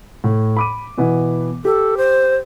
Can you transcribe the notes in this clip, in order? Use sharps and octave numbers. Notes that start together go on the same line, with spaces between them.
A2
B5 D6 D#7
B2 E3 B3
G4 A4
C5